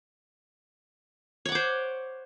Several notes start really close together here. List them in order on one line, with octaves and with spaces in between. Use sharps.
C#5 F#5 D6 C5